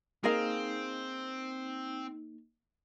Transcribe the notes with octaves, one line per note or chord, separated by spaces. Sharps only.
A#3 C4 D#4 G#4 A#4 F5